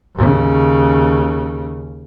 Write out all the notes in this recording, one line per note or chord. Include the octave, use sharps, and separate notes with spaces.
D#2 C#3